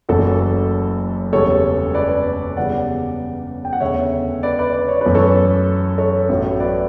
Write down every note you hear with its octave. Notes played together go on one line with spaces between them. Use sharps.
F#1 F#2 E3 A3 F#4 A4
E1 E2 C#3 G3 A4 C#5
B4 D5
E2 C#3 E3 G3 D5 F#5
G5
F#5
E1 D2 C#3 C#5 E5
B4 D5
B4 D5
D5
C#5
F#2 E3 A3 B4
A4 C#5
A4 C#5
A1 A2 F#3
B4 D5